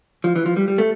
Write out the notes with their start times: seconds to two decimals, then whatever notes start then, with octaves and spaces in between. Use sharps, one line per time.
0.24 F3
0.36 E3
0.46 F3
0.56 G3
0.68 G3
0.78 A3